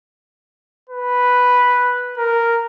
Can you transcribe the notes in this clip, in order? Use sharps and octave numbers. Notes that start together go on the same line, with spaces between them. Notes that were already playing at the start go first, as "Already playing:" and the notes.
B4
A#4